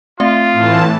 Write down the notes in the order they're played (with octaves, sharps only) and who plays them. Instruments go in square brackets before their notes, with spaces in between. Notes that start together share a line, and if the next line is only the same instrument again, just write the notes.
[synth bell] A3 C4 E5 [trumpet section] F4
[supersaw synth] A2 E3 A5